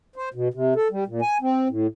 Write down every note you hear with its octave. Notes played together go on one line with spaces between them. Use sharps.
C5
B2
C3
A4
G3
A#2
G#5
C4
A2